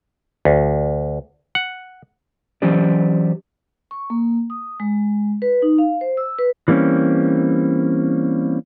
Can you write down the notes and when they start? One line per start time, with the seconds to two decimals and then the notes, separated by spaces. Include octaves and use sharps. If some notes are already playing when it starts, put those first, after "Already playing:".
0.45 D2
1.55 F#5
2.62 E3 F#3 C#4 G4 C5 D5
3.91 C#6
4.10 A#3
4.50 D#6
4.80 G#3
5.42 B4
5.62 D#4
5.78 F5
6.01 C5
6.17 E6
6.39 B4
6.68 E3 G3 A#3 C4 C#4